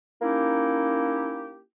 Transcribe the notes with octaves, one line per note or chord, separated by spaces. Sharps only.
A#3 C#4 D#4 E4 G4